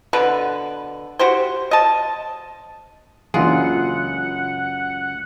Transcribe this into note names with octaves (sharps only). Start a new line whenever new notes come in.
B2 D3 B4
F#4 G4 C5
D#5 A5
C#2 F#2 E3 A#3 D4 F4 G#4 F#5